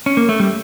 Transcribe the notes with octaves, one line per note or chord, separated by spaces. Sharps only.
C#4
A#3
A3
G3